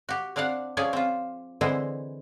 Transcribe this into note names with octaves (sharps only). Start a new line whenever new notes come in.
F#4 G4
C4 D4 D5 F5 F#5
F3 C#4 G#4 D5
C4 F4
D3 E3 G#3 C4 E4 C5